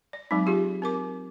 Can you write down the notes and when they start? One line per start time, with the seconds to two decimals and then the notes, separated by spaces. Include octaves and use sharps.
0.13 D5
0.31 F#3 G#3 C4 D#4
0.46 F4 G4 G#4
0.82 C4 A#4 D6